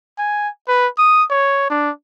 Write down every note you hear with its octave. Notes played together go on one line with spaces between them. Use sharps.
G#5
B4
D#6
C#5
D4